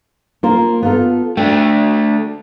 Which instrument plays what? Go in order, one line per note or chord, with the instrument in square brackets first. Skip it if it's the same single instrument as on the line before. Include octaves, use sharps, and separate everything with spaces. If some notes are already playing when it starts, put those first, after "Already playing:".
[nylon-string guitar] A#3 F4 C5
B3 F4 A4
[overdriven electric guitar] A3 D4 [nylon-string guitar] G5